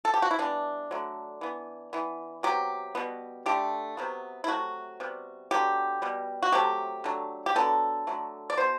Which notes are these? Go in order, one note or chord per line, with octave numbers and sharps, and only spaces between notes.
A4
G4
F#4
E4
E3 G3 B3 D4
D3 F#3 A3
E3 B3
E3 B3
C3 F#3 B3 G4
B2 G3 B3
D3 A3 G4
C3 F#3 B3
E4
C3 F#3 A3 F#4
C3 G3 B3
D3 F#3 B3 G4
B2 G3 B3
F#4
C3 F#3 A3 G4
D3 F#3 A3
G4
D3 F#3 B3 A4
D3 F#3 A3
D5
B2 F#3 B3 C5